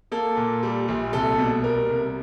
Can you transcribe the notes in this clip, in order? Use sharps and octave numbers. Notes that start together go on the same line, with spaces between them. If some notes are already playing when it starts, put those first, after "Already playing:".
A#3 A4
A#2
G3
A#1
C2 A4
B2
G3 A#4
C2